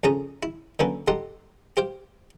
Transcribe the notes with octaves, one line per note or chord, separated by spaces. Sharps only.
F2 C#3 C#4 A4 A#5 D#6
E4
D3 F#3 A#3 C#4 A4 B4
D#4 G4 A4 F#5 C6
G4 C5 F5 G5